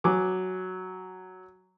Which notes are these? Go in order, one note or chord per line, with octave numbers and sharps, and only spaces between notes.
F#3 G#5 D6